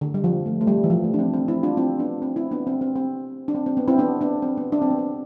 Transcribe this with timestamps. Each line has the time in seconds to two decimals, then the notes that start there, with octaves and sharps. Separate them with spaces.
0.01 D3
0.14 G3
0.24 F3
0.46 A3
0.61 A3
0.67 G3
0.84 E3
0.90 F3
1.04 A3
1.14 D4
1.19 C4
1.34 C4
1.48 C4 E4
1.63 D4 F4
1.77 C4 E4
1.99 B3 D4
2.22 C4
2.36 C4 E4
2.51 B3 D4
2.67 C4
2.81 C4
2.96 C4
3.48 D4
3.54 C4
3.66 C4
3.77 B3
3.88 C4 E4
3.98 B3 D4
4.21 B3 D4
4.42 C4
4.57 B3
4.72 D4
4.82 C4
4.91 B3
4.99 C4